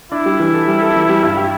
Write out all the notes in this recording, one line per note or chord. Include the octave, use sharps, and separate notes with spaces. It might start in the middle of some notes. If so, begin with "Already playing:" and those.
D4 E4
G3
E3
A4
G3
A4
E3
G3
G2
G4